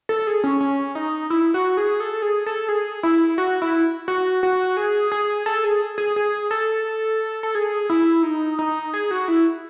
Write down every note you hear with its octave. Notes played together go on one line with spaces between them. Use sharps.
A4
G#4
C#4
C#4
D#4
E4
F#4
G#4
A4
G#4
A4
G#4
E4
F#4
E4
F#4
F#4
G#4
G#4
A4
G#4
G#4
G#4
A4
A4
G#4
E4
D#4
D#4
G#4
F#4
E4